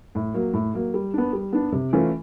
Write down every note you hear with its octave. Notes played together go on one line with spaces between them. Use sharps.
A2
F#3 A#3
A2
F#3 A#3
G3
B3 D4
G3
B3 D4
C3
E3 A3 C#4 F4